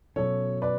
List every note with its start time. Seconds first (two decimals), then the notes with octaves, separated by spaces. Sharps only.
0.16 B2 F#3 C#4 A4 C#5
0.62 B4 D5